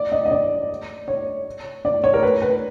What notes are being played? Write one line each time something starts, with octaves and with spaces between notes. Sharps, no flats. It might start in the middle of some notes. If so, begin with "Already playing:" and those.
Already playing: D5
D#5
D#5
D5
C#5
D5
C#5
A#4
B4
B4